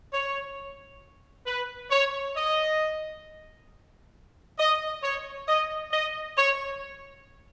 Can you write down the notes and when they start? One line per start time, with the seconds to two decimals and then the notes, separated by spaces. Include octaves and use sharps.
0.13 C#5
1.46 B4
1.91 C#5
2.36 D#5
4.58 D#5
5.03 C#5
5.48 D#5
5.92 D#5
6.37 C#5